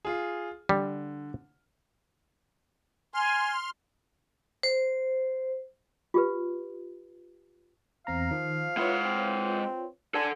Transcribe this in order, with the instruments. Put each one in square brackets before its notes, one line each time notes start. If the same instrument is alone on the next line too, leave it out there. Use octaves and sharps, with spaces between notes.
[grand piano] F4 G#4
[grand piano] D3 [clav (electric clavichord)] G3
[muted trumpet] G#5 [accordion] C6 F6
[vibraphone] C5
[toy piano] F4 G4 B4
[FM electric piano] E2 C4 A#5 [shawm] F5
[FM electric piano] D#3 [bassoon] F3
[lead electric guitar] G#3 F#5 [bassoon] E4 [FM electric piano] F4 B4 C#5
[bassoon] C4
[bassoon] D4 [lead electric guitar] A4 F#5 [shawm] G#5